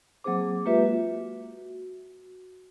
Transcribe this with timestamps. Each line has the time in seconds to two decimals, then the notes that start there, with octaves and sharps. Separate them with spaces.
0.24 F#3 A#3 C4 G#4 C5 D6
0.65 G#3 A#3 F4 G4 B4 E5
0.86 F#4